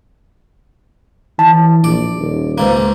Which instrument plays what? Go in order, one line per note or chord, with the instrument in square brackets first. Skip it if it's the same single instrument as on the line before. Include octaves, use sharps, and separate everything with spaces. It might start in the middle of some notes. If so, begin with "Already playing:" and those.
[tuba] E3 [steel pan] A5
[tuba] A#1 [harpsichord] D5
[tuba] D#1
[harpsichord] C#2 G#2 A#3